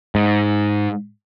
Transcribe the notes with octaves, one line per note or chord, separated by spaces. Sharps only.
G#2